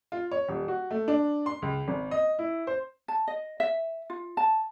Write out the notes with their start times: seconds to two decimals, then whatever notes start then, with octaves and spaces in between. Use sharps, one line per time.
0.12 F4
0.32 C#5
0.48 D#1
0.68 F#4
0.91 A3
1.08 D4
1.46 C6
1.62 C#2
1.88 G#1
2.11 D#5
2.39 E4
2.67 C5
3.08 A5
3.28 D#5
3.60 E5
4.10 F4
4.37 A5